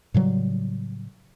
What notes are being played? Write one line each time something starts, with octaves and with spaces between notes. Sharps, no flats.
A2 C#3 F#3 G3